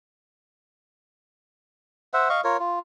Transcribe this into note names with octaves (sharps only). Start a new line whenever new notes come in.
C5 E5 F#5
D#5 F5 C#6
F4 A#4 C#5
F4